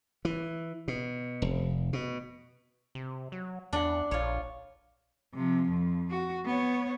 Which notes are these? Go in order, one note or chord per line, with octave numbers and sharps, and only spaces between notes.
E3
B2
F1
B2
C3
F#3
E2 D4 F#5
A#1 F4 C#5
C3 F3
F2
F#4
B3 C#5